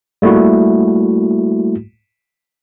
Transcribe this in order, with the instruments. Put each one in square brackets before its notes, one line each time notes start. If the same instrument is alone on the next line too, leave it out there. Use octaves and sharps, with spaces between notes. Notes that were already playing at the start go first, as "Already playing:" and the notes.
[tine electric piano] G3 A3 A#3 E4 F#4